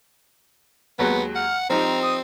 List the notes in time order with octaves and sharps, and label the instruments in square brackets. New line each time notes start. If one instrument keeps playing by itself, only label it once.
[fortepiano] D#2 F#3 G#3 [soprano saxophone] B3
[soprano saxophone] F#5 [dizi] F6
[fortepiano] F3 D#4 G4 [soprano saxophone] C4 [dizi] A#5
[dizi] D#6